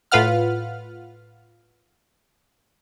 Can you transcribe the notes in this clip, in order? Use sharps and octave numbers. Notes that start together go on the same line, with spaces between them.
A2 F4 B4 F5 F#5 F6